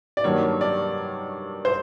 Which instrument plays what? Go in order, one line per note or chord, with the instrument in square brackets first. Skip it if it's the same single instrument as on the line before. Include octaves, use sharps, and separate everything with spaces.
[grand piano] D5
[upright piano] G2 D#3 F#3 A#3 D4 [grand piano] C#5
[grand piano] D5
C5